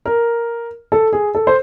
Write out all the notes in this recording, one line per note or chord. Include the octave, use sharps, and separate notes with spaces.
A#4
A4
G#4
A4
C5